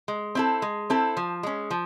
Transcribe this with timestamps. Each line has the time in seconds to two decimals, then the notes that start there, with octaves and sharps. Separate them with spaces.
0.08 G#3
0.35 C4 E4 A4
0.62 G#3
0.90 C4 E4 A4
1.17 F3
1.43 G#3 C#4
1.71 F3